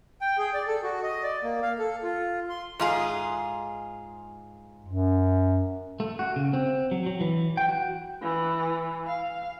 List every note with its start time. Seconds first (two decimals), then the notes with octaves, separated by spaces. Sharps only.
0.21 G5
0.38 G#4
0.54 D5
0.67 A4
0.83 F#4
1.03 D#5
1.23 D5
1.43 A#3
1.63 F5
1.79 A4
2.03 F4
2.50 C6
2.79 G#2 F4 G#4
4.86 F#2
6.00 A3
6.19 F#4
6.36 C#3
6.53 C4
6.91 F#3
7.06 F#3
7.21 E3
7.57 G5
7.69 F#4
8.22 E3
9.06 F5